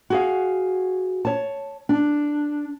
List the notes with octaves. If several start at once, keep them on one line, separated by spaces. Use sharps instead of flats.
F#4 G#4 F5
C#5 A5
D4